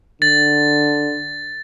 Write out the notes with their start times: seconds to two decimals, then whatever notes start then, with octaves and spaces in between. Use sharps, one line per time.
0.22 D3 A6